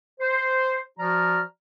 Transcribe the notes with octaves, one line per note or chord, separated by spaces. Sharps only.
C5
F3 F#4 D5 A#5 F6